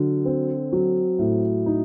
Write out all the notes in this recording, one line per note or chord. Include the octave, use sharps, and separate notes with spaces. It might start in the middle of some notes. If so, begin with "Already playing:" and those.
Already playing: D3 F#3
C4
F#3
A2
D#4